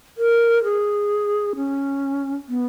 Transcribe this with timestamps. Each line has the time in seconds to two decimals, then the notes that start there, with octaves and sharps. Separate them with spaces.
0.18 A#4
0.64 G#4
1.56 C#4
2.49 B3